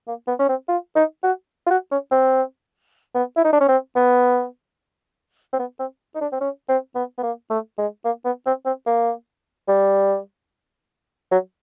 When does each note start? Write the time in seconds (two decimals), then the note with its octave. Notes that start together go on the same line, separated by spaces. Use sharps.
0.07 A#3
0.27 B3
0.39 C#4
0.49 C4
0.68 F4
0.95 D#4
1.23 F#4
1.66 F4
1.70 F#4
1.91 C#4
2.11 C4
3.15 B3
3.36 E4
3.44 D#4
3.53 D4
3.61 C#4
3.68 C4
3.95 B3
5.53 C4
5.59 B3
5.79 C4
6.15 D#4
6.21 D4
6.32 C4
6.41 C#4
6.69 C4
6.95 B3
7.18 B3
7.23 A#3
7.50 A3
7.78 G#3
8.05 A#3
8.25 B3
8.46 C4
8.65 C4
8.86 A#3
9.68 G3
11.31 F#3